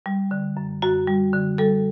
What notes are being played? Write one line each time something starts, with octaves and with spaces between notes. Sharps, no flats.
G3
D3
F#2
F#2 F#4
G3
D3
G3 A4